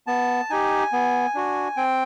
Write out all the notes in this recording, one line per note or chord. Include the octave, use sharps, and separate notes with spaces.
B3 A5
D#4 G4 G#5
B3
D4 F#4
C4 G5